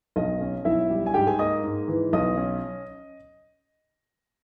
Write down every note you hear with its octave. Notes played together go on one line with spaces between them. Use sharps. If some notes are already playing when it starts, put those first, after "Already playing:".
B1 D#5
C#4
B1 E4 E5
G3
G#5
G#2 G4 G5
G#4 G#5
A#3 D#5 D#6
G#2
E3
B1 D#5 D#6
C#4